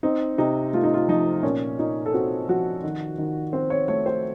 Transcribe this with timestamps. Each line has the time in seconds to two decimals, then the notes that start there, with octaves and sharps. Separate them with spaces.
0.03 C4 D#4
0.38 C3 D#4
0.73 A3 F4
0.83 D#4
0.94 F4
1.08 F3 D#4
1.43 A#2 C#4
1.79 A#2 D#4
2.06 A4
2.13 C4 F#4
2.48 F3 F#4
2.83 D#3
3.18 D#3
3.53 C4 C5
3.70 C#5
3.88 A3 C#5
4.06 C5